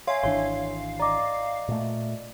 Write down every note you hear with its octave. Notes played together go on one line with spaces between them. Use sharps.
C#5 E5 F5 G#5 C6
G#1 E3 D4 C#5 C6
D5 D#5 A#5 D6
A#2 A3